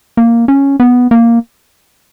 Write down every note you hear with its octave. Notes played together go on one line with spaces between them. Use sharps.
A#3
C#4
B3
A#3